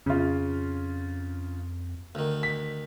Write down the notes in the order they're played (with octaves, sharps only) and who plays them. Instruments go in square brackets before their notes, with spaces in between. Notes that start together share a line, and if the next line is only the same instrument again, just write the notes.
[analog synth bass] F2 [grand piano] C#3 F4
[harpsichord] D2 D#3
[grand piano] B6